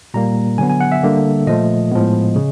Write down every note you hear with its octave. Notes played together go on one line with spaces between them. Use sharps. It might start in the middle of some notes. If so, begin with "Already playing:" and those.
A#2 G3 A#3 A#5
D3 F#3 B3 G#5
G#5
F#5
E5
D3 G3 A#3
A#2 F3 A3 D#5
A2 F3 G#3 B3
C#3